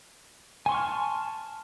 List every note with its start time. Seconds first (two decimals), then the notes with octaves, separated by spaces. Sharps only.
0.66 G#5
0.69 C6
0.72 C#6
0.75 F6
0.77 A5